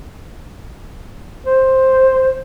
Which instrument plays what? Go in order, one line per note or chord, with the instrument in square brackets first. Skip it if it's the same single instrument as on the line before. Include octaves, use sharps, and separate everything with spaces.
[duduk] C5